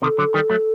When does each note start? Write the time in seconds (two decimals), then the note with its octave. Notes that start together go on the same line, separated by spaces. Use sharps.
0.02 C3 D#3 A4
0.18 D3 F#3
0.34 D#3 G3
0.50 F#3 A3